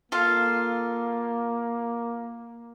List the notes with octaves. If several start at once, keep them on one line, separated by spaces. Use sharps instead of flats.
A#3 F4 A4 F5